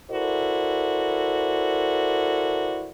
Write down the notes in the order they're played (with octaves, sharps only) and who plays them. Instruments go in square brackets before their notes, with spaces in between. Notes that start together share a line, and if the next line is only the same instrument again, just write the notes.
[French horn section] E4 F#4 A4 A#4 C5 D5